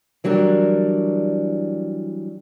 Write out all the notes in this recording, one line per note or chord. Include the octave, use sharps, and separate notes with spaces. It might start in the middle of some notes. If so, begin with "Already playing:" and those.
E3 F#3 G3 D4 A#4